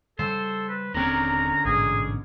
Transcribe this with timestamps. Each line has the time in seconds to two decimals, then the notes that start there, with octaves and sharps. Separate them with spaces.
0.19 C#3 G3 A4 C5
0.69 B4
0.94 D#1 D3 C4 C#4 A#4 A#5
1.65 A1 G#2 B2 G#4